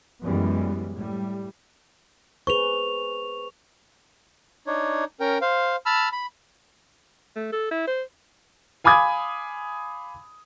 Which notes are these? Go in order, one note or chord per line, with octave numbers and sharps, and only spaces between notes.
F#2 E3 G3 G#3 B3
A2 G3
G#4 B4 C5 C#6 F7
D4 D#4 C#5
C#4 A#4 G5
C5 F5
A5 B5 E6 F6
B5
A3
A4
E4
C5
F5 G#5 B5 D6 D#6 G#6